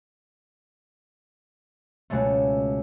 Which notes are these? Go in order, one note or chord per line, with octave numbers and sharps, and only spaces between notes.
C#2 B2 F#3 G#3 A3